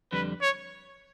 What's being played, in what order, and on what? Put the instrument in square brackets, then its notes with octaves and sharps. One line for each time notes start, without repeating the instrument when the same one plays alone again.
[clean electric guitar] F2 D3 G3 [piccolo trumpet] B4
[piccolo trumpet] C#5